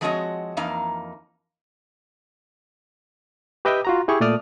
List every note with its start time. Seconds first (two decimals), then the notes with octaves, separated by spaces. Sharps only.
0.01 F3 G#3 C4 F#4 C#5 D#5
0.57 F2 E3 A#3 D#4 F5
3.65 G4 B4 D#5 E5 G5 D6
3.85 F4 F#4 A#5
4.08 E4 G4 G#4 C#6
4.20 A#2 A3 D5 D#6 F6